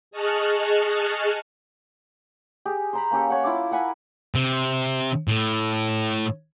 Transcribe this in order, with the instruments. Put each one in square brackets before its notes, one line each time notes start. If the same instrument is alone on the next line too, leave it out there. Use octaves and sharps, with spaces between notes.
[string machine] G#4 D#5 A5 C#6 F6 F#6
[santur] G4 G#4
C5 A#5 B5
A#3 C#4 G4 A4
C#5 F#5
E4 F4 A4 D6
A#4 F#5 G#5 B5
[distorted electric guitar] C3
A2